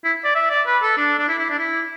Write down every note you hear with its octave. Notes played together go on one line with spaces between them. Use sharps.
E4
D5
E5
D5
B4
A4
D4
D4
E4
E4
D4
E4